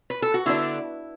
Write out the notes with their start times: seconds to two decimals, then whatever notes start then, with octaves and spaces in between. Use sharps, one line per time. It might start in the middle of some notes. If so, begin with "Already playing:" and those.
0.10 B4
0.22 A4
0.34 F#4
0.46 D3 B3 D4 E4